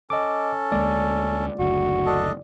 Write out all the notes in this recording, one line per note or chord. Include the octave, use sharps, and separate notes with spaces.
C#4 A4 D#5 D6
D2 G#3 A#3 D5
F#1 D2 F#4
D4 A4 D#5